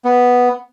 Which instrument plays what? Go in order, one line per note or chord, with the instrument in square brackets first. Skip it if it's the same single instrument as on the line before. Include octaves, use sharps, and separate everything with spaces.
[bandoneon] B3